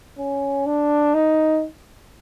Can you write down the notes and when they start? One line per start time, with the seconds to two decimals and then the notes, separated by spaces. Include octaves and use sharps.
0.18 C#4
0.66 D4
1.14 D#4